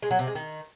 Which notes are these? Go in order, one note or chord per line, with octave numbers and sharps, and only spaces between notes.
G#3
F#3
C3
G#3
D#3